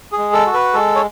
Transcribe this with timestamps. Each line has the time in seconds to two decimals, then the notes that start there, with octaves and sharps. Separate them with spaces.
0.12 G#4
0.18 G#3
0.33 A4
0.46 F#4
0.54 B4
0.74 G#3 A4
0.95 C#5